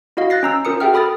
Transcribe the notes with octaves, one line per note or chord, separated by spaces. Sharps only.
E4 F#4 D#5 F5
F#6 A6 A#6 C7
C#4 A#5 E6
C#4 F4 A#4 D#6 C#7
F#4 G#4 E5 G5 F6
A4 B5 D#6 F6 A6